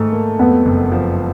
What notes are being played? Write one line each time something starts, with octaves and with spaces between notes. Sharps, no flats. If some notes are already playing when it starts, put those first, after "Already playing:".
Already playing: G#2 D#3 A3
A#3
F2 B3
F#1
F3